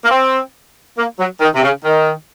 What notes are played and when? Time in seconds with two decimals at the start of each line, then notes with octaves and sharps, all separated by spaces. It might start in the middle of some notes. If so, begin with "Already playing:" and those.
0.05 A#3
0.11 C4
0.98 A#3
1.20 F#3
1.41 D#3
1.55 C3
1.63 C#3
1.85 D#3